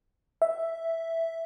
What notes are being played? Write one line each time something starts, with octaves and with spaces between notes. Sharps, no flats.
E5